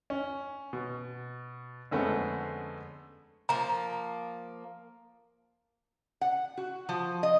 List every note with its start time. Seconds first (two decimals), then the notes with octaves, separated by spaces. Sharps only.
0.10 C#4
0.73 B2
1.91 F2 D3 G#3 A3 B3 C#4
3.49 F3 A#3 A#5
6.21 F#5
6.58 F#4
6.89 F3
7.23 D#5